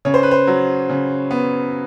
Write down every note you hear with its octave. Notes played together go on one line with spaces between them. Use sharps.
C#3 C#5
C5
B4
C5
F#3
C#3
B3